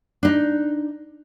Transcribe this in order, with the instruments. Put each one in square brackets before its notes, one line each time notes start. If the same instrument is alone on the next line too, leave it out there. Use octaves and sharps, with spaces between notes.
[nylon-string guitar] D4 D#4